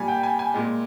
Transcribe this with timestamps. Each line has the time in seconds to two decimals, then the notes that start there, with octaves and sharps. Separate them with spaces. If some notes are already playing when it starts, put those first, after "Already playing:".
Already playing: A#2 G3 G#5
0.08 G5
0.23 G#5
0.39 G#5
0.54 A#2 G#3